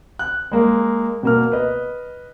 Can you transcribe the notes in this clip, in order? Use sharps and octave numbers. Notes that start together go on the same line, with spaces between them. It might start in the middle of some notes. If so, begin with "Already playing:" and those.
F#6
G#3 A#3
B2 A#3 F6
B4 D#5